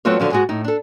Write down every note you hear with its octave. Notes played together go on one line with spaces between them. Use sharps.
F#3 A3 B3 C4 F4 C#5
D3 F3 F#3
G#2 G#3 F#4
A2 D#4
D4 A4